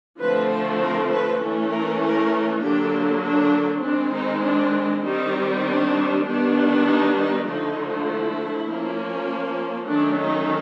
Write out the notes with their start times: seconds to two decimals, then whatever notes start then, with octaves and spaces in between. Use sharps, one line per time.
0.19 D3 F3 A3 C4 B4
0.49 A4
0.79 A#4
1.09 B4
1.40 E3 A3 C#4
1.70 A#4
2.00 A#4
2.61 D3 F#3 A#3 D4 G4
3.22 D4
3.82 D#3 G#3 C4 D4
4.13 D#4
4.43 D4
5.03 D#3 G3 C4 D#4
5.64 D4
6.25 D#3 G3 B3 D4
6.86 D#4
7.16 D#4
7.46 D3 F3 A3 D#4
8.07 E4
8.68 F3 A#3 C#4
9.89 D#3 F#3 A3 C#4 D4
10.19 D#4